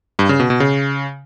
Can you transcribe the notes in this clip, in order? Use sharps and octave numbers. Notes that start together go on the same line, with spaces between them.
G2
C#3
B2
B2
C#3